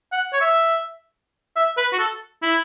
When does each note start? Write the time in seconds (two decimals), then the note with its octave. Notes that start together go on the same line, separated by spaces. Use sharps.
0.12 F#5
0.33 C#5
0.41 E5
1.56 E5
1.77 B4
1.93 F#4
1.99 A4
2.42 E4